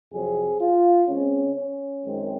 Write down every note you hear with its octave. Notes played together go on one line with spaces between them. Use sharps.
F2 C3 F#3 C4 G#4
F4
C#3 G#3 C4 C#4
C#4
F#2 D#3 G#3 C4